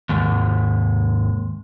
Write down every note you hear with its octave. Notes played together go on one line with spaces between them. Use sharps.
D#2 G#2 C3